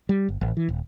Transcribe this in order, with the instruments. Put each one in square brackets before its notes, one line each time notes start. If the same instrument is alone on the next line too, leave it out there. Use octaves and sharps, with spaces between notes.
[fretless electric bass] G3
G1
A1
E3
D#1